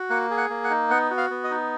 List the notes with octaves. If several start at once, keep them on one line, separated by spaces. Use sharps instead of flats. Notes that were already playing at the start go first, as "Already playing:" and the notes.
Already playing: F#4
A#3 F#5
G#4
F#5
A#3
F#5
D#4
B3 F#5
F#4
F5
B3
D#5
D#4